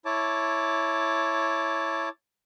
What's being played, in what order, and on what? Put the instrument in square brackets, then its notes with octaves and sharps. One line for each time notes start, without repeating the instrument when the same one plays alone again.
[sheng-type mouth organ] E4 C#5 A5 D6